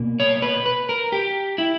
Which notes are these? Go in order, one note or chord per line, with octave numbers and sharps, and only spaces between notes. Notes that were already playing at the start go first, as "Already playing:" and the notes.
Already playing: B2 A#3
C#5
B4
B4
A#4
G4
E4